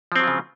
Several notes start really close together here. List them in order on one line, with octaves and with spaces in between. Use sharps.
F3 C4 F#3 F4 C#3